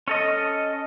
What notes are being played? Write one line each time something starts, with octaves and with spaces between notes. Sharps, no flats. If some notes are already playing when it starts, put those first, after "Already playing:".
C#4 A4 D#5